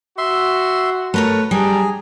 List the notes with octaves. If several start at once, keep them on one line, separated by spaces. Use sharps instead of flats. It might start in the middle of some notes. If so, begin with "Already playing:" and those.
F#4 E5 C6
A3 A#4 B4 C#5
G3 D4 G#4 A#5